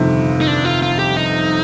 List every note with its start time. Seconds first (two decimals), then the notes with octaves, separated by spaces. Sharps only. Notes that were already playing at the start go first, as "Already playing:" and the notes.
Already playing: G1 F2 C3 D#3
0.41 D#4
0.48 D4
0.65 F4
0.83 F4
0.99 G4
1.17 D#4